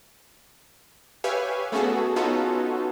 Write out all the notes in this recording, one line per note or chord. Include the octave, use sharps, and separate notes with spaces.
G4 B4 C#5 E5 F5 G#5
A3 B3 C#4 F#4 G#4 A4
B3 C#4 D#4 F4 F#4 A4